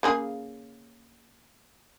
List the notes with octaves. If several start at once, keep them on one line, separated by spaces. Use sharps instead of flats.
C#3 A#3 G#4